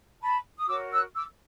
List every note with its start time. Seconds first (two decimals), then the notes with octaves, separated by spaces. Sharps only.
0.21 A5 B5
0.58 D#6
0.68 F#4 A#4 C#5 D6 E6
0.92 E6 F#6
1.15 D6 E6